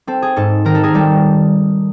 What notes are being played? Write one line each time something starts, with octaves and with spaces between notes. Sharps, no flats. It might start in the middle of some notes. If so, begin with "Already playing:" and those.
C4 A4
G#4
G#2 A4
D#3 A#4
A4
G#4 A#4
G3 A4